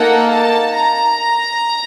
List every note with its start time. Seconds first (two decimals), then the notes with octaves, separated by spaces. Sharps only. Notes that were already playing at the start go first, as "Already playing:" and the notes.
Already playing: A#3 D#4 A4 F#5
0.29 A5
0.75 A#5